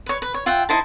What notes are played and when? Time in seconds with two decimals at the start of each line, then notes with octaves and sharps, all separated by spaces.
0.06 B4 C#5
0.22 B4
0.34 C#5
0.46 F4 E5 F#5 G5
0.69 D#4 E4 C5 A5